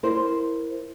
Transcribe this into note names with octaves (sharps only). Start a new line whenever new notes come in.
E4 A#4 C5